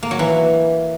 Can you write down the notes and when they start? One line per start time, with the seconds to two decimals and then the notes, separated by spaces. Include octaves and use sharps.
0.03 A#3
0.11 F#3
0.19 E3